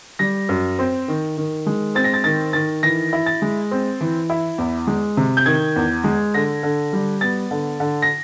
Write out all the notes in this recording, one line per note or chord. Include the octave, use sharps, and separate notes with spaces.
G3 A#6
F#2
C4
D#3
D#3
G#3
C4 A6
A#6
A6
D#3 A6
D#3 A6
E3 A#6
E4
A6
G#3
C4
E3
E4
E2
G#3
C3
G6
D#3 G#6
E2
G#3
D3 A#6
D3
G3
B3 A6
D3
D3
A#6